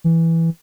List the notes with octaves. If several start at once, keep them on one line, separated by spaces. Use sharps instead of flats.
E3